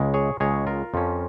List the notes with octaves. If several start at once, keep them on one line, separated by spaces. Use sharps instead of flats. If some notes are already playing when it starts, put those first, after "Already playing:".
Already playing: C#2 C#3 G#3
G#4 C#5
C#2 C#3 G#3 G#4 C#5
F4 A#4
F2 F3 C#4